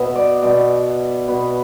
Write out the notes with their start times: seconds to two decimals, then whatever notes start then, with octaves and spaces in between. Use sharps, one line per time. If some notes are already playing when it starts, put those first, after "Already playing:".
Already playing: B2 B3 E5 F#5
0.15 D5
0.43 B2 B3 D5
1.28 B2 B3 B4